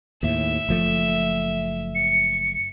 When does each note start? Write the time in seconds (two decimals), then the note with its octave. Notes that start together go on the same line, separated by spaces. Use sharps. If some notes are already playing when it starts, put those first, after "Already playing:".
0.23 D#2 A2 E5
0.69 F#1 F3 A3
1.95 C#7